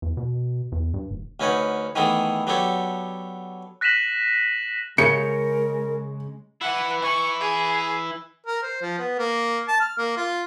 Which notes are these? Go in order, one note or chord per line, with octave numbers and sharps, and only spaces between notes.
E2
B2
E2
G2
D#1
D2 C#4 D#4 B4 C#5 F#5
D#3 E3 A3 B3 G#4 A4
F#3 B3 D4 G4 A4 C#5
F#6 A#6 B6 D#7 E7 F#7
C#3 G#3 A#4 C#7
E3 E4 F#5
E3 E4 C#6
G#4
A#4
C5
F3
B3
A#3
A5
F6
A#3
F4